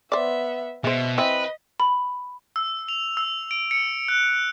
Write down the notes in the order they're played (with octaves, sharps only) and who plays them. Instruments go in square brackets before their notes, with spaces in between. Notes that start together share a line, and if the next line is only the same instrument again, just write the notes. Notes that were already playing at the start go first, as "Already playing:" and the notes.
[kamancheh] B3 E5 [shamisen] C5 D5
[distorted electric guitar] B2 [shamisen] G#3 C5 [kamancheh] E5
[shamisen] E3 C4 [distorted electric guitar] B4 [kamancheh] D#5
[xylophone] B5
[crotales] E6
F7
E6
D7
C#7
F#6